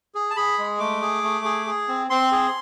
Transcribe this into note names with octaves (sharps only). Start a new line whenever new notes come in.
G#4
A5
G#4 B5
G#3
A3 D6
G#4
A3
G#4
G#4
C4
C4 C6
G#4